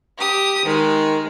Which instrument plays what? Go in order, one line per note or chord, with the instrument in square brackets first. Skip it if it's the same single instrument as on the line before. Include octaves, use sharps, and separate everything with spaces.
[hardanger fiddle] G4 D#6
[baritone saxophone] D#3 [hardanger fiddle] G#3